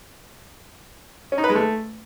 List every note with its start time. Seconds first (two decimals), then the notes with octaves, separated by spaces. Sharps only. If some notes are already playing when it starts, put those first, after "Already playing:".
1.32 C#4
1.38 D#4
1.44 B4
1.50 G#3
1.55 A3